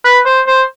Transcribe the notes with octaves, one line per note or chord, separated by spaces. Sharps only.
B4
C5
C5